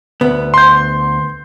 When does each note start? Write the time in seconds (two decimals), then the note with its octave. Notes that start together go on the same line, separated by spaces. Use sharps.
0.21 D2 B3
0.54 C6 G6